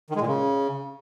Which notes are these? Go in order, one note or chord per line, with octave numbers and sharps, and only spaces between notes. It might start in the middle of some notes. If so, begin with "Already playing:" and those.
D#3
G#3
A#2
C#3